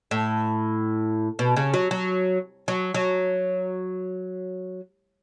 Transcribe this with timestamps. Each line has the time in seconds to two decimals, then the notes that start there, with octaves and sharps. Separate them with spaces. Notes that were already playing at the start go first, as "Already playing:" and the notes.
0.11 A2
1.39 B2
1.56 C#3
1.74 F#3
1.91 F#3
2.68 F#3
2.94 F#3